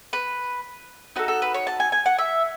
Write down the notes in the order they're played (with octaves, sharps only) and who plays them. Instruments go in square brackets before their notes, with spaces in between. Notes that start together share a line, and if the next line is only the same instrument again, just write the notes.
[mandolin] B4
D#4 F#4 A4 B4
A4
B4
C#5
A5
G#5
G#5
F#5
E5